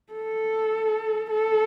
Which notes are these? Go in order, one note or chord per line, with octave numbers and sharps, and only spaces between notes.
A4
A4